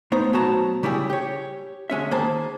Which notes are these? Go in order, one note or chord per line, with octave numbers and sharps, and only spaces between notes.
A3 B3 D#4 C5
B2 F#3 A3 A5 A#5
C#3 G3 E4 G4 G#4
G4 C#5
D3 G#3 C#4 E5
D#3 A#3 G#4 C5 A5